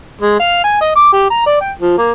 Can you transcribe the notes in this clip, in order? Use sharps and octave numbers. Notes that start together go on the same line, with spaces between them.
G#3
F5
G#5
D#5
D6
G4
A#5
D5
G5
F3
A#3